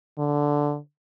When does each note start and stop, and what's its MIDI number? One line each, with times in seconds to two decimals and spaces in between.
0.18 0.78 50